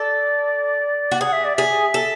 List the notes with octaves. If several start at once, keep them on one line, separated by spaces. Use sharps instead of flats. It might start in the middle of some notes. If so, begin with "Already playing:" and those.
Already playing: A4 D5
F#4
G#4 F#5
E5
D5
G#4 E5
A4